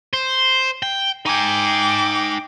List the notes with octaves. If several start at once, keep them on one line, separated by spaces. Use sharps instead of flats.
C5
G5
D#4 G5 G#5 D6